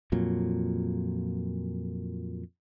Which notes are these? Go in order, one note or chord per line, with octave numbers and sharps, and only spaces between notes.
F2 A#2 F#3